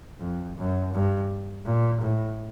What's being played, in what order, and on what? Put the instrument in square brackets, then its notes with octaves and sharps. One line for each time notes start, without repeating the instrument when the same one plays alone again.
[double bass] F2
F#2
G2
A#2
A2